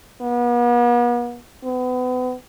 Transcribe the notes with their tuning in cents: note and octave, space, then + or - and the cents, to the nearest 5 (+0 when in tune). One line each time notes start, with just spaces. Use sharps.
B3 -40
B3 +35